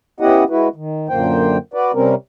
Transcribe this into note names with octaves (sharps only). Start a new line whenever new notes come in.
B3 C#4 E4 G4 D#5 F#5
G#3 E4 F#4 B4
D#3
F#2 A#2 D3 A#3 C5 G5
F#4 B4 D5
C3 G3 C4 C#4 A#4